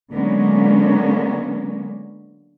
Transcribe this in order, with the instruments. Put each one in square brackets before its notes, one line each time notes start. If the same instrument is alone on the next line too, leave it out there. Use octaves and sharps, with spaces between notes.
[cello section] D3 F#3 G#3 A#3 B3 C#4